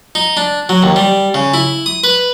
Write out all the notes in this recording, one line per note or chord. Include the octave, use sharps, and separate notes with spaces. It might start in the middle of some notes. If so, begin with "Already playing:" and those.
D#4
D4
F#3
D#2
G3
C#3
E4
D#6
B4